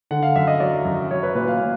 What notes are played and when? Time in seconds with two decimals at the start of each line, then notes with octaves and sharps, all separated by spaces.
0.11 D3 F#5
0.23 F5
0.36 F#2 E5
0.47 D#5
0.60 F#3 D5
0.85 F#2
1.11 F#3 C#5
1.23 B4
1.35 A#2 B4
1.48 F5
1.61 A#2